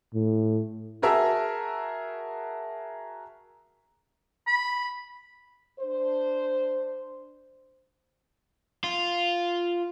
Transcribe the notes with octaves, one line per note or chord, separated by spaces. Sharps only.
A2
F#4 G#4 A#4 E5 A5 E6
B5
D4 C5
F4